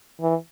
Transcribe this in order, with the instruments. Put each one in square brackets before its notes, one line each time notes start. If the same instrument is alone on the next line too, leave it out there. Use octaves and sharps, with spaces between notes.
[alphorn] E3